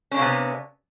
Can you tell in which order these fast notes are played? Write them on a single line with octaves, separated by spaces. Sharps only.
C#4 D4 A#3 C3 B3